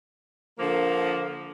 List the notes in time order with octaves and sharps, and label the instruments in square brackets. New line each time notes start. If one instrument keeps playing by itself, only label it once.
[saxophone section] D3 F3 A#3